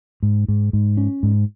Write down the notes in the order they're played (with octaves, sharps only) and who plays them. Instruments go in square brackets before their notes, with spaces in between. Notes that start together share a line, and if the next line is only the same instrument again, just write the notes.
[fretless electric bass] G#2
G#2
G#2
C#4
G#2